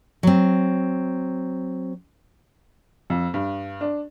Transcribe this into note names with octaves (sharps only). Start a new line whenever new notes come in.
F#3 C4
F2
G2
D4